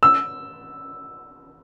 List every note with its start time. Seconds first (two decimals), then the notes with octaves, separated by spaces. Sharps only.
0.03 E6